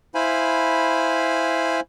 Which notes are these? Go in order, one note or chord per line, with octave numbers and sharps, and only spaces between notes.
E4 C5 F5 G#5 B5